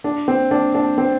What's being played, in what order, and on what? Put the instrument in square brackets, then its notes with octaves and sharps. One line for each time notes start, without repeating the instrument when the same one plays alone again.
[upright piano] D4
C4
D4
D4
C4